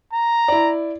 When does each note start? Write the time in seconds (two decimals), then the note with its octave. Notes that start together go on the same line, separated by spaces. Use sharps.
0.13 A#5
0.48 E4 D5